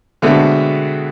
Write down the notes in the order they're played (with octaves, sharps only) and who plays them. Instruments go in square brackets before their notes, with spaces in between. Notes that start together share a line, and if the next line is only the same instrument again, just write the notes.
[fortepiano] B2 D3 G#3 A3 B3 C4